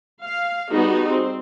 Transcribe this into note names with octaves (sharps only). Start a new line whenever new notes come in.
F5
G3 B3 D#4 F#4 G#4
C4